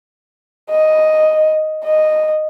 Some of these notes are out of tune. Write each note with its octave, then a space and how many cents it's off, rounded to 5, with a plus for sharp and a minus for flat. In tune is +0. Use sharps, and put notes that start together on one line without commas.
D#5 +0
D#5 -10